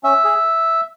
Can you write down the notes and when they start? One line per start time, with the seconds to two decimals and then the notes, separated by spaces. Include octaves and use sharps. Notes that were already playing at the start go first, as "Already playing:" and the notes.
0.03 C#4 E5
0.24 G#4